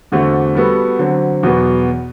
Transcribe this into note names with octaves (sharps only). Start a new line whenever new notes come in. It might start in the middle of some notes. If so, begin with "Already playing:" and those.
E2 D3 A3 C4 F#4
G3 B3 F#4 A4
D3 F#3 C4
E2 B2 F#3 B3 F#4